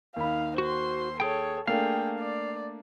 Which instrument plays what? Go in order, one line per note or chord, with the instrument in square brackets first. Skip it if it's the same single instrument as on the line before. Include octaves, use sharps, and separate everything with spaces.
[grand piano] D#2 B5 [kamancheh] D#4 F5
[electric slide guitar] F#4 [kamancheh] C5 C6
[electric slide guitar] G#4 G5 [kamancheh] A4 C#5
[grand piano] A3 A#3 D4 [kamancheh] G#4 G5 [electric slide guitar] F5
[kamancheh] D5